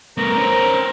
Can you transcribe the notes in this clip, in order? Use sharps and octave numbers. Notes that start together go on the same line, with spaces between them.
A3 B3 A#4
C#4 C5